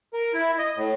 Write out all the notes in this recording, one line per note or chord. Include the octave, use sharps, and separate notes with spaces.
A#4
E4
D#5
A2